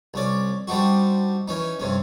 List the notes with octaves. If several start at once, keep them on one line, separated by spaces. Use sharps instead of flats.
C2 C#4 D5
G3 C4 D4 D#4 F#4
E3 C#4 D#4
G2 C3 C#4